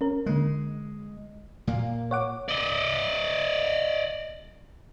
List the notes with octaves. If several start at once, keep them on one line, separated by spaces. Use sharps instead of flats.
C#4 A#4
D3 G#3 A#3
A#2 A#3
C#5 F#5 D6
D5 D#5